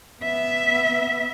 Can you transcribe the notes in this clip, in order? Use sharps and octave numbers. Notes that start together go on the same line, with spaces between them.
B3 E5